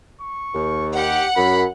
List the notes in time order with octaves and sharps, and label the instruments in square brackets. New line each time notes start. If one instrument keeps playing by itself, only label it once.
[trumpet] C#6
[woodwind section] D#2
[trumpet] G4 [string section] F#5
[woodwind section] F#2 [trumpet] B5